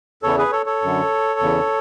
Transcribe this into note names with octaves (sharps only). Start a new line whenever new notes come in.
E2 C#3 E3 A4 C#5
G#4 B4
A4 C#5
A4 C#5
F#2 D3
E2 C#3 E3